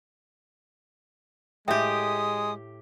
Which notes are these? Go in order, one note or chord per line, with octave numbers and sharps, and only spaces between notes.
A2 G#3 G4 E5 G5 D#6